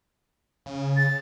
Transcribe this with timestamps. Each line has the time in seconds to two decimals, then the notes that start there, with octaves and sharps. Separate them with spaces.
0.66 C#3
0.97 A6